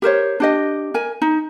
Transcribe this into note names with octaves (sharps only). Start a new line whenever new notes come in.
G4 A#4 C5 C#5
D4 G4 D#5
A#4 G#5
D#4